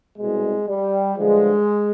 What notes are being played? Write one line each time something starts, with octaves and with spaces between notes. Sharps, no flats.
C2 B2 G#3
G3
G2 D3 F3 G#3